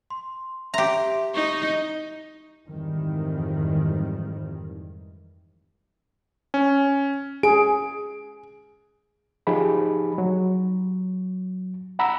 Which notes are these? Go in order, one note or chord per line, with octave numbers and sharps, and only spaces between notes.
C6
G4 E5 A#5 C6
D#4 C#6
F2 G#2 D#3 E3 G3
C#4
G#4 D7
F3 D#4 G4 G#4 B5
F#3
F#5 A#5 B5 E6